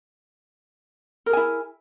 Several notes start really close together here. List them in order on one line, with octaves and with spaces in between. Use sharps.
A#4 G#4 G#5 E4